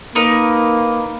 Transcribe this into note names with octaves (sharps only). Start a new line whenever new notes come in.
A#3 D#4 A#4 B4